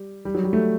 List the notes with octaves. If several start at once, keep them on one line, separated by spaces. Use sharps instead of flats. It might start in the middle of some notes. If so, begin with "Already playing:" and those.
Already playing: G3
G3
F#3
G3
A3